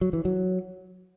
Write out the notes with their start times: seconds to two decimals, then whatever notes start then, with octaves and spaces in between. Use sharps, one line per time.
0.01 F#3
0.13 E3
0.25 F#3